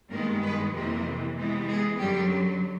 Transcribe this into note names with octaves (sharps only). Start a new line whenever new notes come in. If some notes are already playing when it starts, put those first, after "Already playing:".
G2 D#3 G#3 A#3 B3 A#4
B3 B4
F2 C3 E3 A#3 A#4
C3 E3 G#3 B3
G#3 G#4
F#2 D3 F#3 G3 G4